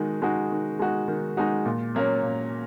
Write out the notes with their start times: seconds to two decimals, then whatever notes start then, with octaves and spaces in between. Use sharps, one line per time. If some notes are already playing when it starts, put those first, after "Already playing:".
Already playing: D#3 G#3 D#4 F#4
0.22 G#3 D#4 F#4
0.52 D#3
0.79 G#3 D#4 F#4
1.08 D#3
1.37 G#3 D#4 F#4
1.65 A#2
1.95 F#3 A#3 C#4
2.22 A#2